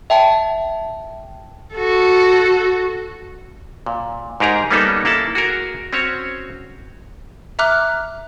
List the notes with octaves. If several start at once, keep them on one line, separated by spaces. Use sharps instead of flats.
E5 G5 A5
F#4 A4
A#2
G#2 D#4 G4 G#4 A#4 A#5
G3 A#3 B3 C#4 D#4 A4
A#3 E4 A4 F#5 A5
F#4 G#4 A#4
C4 C#4 F#4 C#5
E5 A#5 D6 F6 F#6